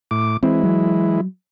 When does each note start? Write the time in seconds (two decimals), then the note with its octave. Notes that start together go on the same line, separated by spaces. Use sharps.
0.11 A2 D6
0.43 E3 G#3 C4 E4
0.63 F#3